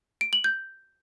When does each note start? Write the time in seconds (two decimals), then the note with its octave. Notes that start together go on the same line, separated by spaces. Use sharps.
0.21 D7
0.33 F#7
0.44 G6